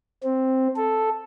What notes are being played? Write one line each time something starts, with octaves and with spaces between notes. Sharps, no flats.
C4
A4